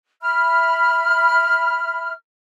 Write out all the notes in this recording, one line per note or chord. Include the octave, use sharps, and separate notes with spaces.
E5 B5 F6